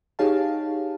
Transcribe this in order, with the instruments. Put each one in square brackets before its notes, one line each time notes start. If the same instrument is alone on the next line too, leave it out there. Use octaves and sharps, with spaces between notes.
[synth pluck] D#4 G4 G#4 C#5 F5 A5